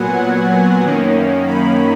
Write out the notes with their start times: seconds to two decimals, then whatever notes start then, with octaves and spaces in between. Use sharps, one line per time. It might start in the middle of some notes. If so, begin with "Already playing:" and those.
Already playing: A#2 F#3 B3 F#5 G#5
0.82 F#2 D#3 A#3 C#4
1.48 B5